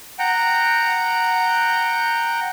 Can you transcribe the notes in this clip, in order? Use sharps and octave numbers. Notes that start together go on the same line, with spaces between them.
F#5 G5 A#5